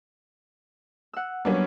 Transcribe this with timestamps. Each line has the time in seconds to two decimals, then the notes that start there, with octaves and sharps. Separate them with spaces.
1.13 F#5 E6
1.45 F#3 G3 A#3 B3 C#4 D4